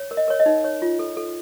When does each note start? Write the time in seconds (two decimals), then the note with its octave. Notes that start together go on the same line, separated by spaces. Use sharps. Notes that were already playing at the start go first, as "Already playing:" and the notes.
Already playing: C#5
0.11 A#4
0.17 D#5
0.28 A#4 C#5
0.40 D#5
0.46 D#4
0.64 C#5
0.82 F4
0.99 A4
1.17 A4